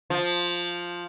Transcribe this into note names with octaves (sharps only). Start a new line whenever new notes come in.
F3